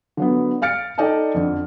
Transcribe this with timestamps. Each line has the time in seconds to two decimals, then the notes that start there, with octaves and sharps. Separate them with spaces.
0.17 D3 F#3 B3
0.62 F5 F6 A6 C#7 D7
0.98 D#4 A4 D5 D#5 G5 A5
1.34 F2 D3